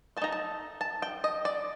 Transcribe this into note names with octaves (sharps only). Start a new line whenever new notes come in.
A3 A5
D#4 A#5
A5
A5
G5
D#5
D5